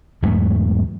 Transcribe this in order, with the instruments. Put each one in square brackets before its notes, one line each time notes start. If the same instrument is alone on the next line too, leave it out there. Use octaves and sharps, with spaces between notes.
[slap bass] E2 G#2 F#3 A3